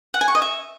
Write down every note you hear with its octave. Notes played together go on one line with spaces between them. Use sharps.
F#5
G#5
C#6
D#5
E5